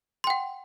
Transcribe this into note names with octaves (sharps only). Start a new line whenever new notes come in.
F#5 G5 C6